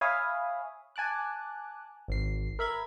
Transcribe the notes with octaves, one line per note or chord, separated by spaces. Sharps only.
C#5 E5 F5 G#5 B5 D#6
G#5 A5 D6 F#6
G#1 C7
A#4 E5 B5 G#6